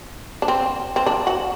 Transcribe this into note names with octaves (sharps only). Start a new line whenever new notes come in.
D4
C4
C4
D4
F#4